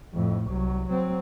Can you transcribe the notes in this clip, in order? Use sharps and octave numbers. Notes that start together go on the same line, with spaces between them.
F2 A2
C2 F#3
F#3 C4